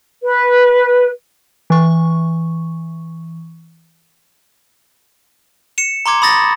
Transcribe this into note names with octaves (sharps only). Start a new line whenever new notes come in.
B4
E3 C#6
C#7 E7
A#5 C6 D6 G#6
B5 D#6 A6 A#6